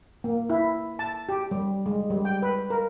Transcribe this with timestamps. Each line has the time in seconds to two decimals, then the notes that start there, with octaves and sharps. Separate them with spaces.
0.24 A#3
0.50 E4
0.99 A5
1.29 G4
1.51 G3
1.86 G#3
2.10 G3
2.25 G5
2.42 B4
2.70 A#4